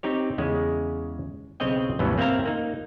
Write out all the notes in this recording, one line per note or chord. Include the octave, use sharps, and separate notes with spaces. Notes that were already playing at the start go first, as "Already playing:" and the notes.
C4 D#4 G4 C#5
E2 C#3 G#3 C#4
B1 C#3 C4 C#5 D#5 G5
D2 G2 B2 E3 F#3 C#4
A#3 C4 C#4 E5 F5 A#5
A#3 D#4